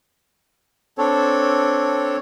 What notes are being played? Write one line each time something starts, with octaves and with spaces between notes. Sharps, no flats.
C4 D4 A4 C#5